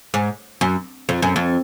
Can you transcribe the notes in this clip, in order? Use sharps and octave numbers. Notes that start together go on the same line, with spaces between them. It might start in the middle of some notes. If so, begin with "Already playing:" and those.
G#2
F#2
F2
F#2
F2